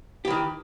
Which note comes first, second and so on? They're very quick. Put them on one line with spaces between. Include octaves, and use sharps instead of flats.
G4 E3 D#3